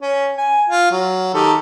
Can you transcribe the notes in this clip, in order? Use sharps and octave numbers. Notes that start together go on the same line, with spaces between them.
C#4
G#5
F4
F#3
D#3 G4 A4